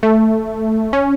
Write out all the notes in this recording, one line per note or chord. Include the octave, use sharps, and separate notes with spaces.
A3
C#4